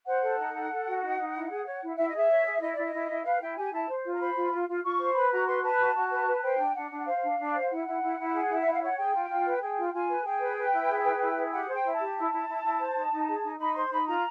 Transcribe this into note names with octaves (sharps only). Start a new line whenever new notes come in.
C5 F#5
A4
D#4
A4
A4
F#4
D#4
D#4
E4
G#4
C#5
E4
E4 E5
D#5
G#4 E5
C#5
G#4
E4 D#5
E4 D5
D#5
E4
E4
B4 F5
E4 G5
G4 G#5
E4 A5
C5
F4
A#5
C5 B5
F4
F4
F4
F4 C#6
C5
B4 B5
F#4 A#5
B4 C6
B4 A5
F#4
F#4
B4
B4
C5 G5
D4
D4 F#5
D4
C5 F5
D4
D4
C5
E4 F#5
E4
E4
E4
G#4
E4
E5
E4
F5
C#5 F#5
G#4 G5
F4
F4
B4
G#4 G5
F4
F4 G#5
B4
G#4 G5
B4
B4
E4
G#4
B4
E4
G#4
G4 F#5
C5
G5
E4
G4 A5
E4
E4
E4
E4
C5
D#4
D#4
G#4
D#4
D#4 B5
C5 C6
D#4 B5
F4 A#5